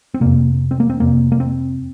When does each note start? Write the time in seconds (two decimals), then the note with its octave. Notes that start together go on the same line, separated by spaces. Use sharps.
0.14 C4
0.21 F2 C3 A#3
0.71 C4
0.80 A#3
0.90 C4
1.00 F2 C3 A#3
1.32 A#3
1.40 C4